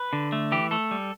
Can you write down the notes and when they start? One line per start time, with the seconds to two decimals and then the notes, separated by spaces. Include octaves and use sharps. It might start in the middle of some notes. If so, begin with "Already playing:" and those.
Already playing: B4
0.13 D3
0.32 A3
0.52 E3 G4
0.71 A3 A4
0.91 G3